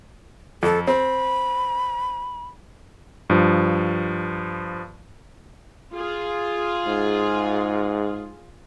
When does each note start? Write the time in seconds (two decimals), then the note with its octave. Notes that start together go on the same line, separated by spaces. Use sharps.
0.63 F2 A4
0.87 C4 B5
3.30 G2 F3
5.94 F4 G#4
6.87 G#2